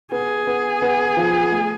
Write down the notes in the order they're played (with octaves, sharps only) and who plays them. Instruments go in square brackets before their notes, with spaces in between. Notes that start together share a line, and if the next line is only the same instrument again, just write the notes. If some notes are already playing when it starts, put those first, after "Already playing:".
[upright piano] B3 [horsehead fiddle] G#4
[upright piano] B3
B3
F3
A3